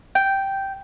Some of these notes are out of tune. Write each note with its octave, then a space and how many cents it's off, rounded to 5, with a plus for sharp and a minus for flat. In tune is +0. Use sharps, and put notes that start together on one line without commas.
G5 -5